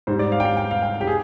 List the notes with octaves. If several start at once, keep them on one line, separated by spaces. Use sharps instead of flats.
G#2 G3 C5
D5
F5
G5
F5
G5
F5
G5
G4
G#4